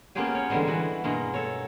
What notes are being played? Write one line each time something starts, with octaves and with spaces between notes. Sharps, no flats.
A#3 B3 C#4 F4 G4 G#4
C#5
D3 E3 G3 G#3 B3
E3 B3 F#4 B4
G2 B2 G#3 A#3
A4 C#5